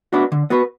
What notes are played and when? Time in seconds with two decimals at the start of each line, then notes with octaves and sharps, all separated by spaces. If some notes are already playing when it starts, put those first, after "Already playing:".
0.13 B3 D4 F#4 B4
0.32 D3
0.50 B3 F#4 B4